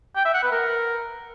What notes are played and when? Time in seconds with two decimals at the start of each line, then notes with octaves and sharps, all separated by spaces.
0.16 G5
0.25 E5
0.34 F#5
0.43 B4
0.52 A#4